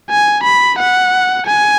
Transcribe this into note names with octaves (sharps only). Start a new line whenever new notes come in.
G#5
B5
F#5
G#5